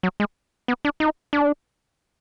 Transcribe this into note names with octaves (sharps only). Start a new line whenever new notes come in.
F#3
G#3
B3
D4
D#4
D4